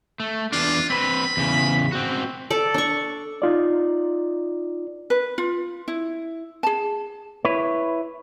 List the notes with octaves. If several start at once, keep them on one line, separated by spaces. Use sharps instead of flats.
A3
E2 D4 F4
C4 B4 B5
E2 C#3
C4 F#4
A4 D5
D4 C#6
D#4 F4 D5
B4
F4
E4
G#4 A5
E4 B4 C#5